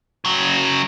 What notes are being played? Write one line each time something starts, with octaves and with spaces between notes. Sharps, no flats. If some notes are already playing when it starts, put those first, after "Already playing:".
C#3 F#3